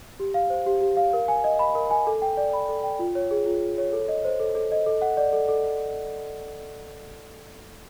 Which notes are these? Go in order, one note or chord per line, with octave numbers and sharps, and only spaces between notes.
G4
F5
C5
G4
G4
F5
A#4
G#5
D#5
B5
A#4
G#5
A4
G5
D5
B5
A4
G5
F4
C#5
G#4
F4
F4
C#5
A4
D#5
C5
A4
A4
D#5
A4
F#5
D5
A4
A4